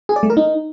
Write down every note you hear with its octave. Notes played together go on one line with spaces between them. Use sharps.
G#4
D5
A3
A#4
D#4